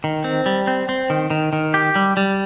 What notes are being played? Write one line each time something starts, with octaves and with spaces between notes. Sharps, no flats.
D#3
C4
G3
C4
C4
D#3
D#3
D#3
G4
G3
G3